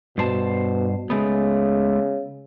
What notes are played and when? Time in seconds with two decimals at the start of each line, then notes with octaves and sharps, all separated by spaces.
0.18 G2 B2 C5 A5
1.10 C#3 G#3 A3 B3